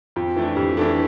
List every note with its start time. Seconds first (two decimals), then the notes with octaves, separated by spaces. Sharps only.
0.16 F2 F4
0.36 E3 A3 D4
0.57 F2 G4
0.77 E3 A3 D4 A4